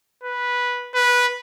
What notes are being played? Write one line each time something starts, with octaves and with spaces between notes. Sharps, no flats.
B4
B4